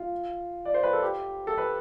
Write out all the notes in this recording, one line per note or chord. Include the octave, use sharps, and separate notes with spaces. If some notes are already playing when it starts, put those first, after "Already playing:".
Already playing: F4
D5
C5
B4
A4
G4
A4
B4